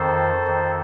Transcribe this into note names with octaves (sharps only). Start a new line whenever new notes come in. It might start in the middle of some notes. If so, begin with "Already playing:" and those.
Already playing: F2 D#3 A4 C5
F2 D#3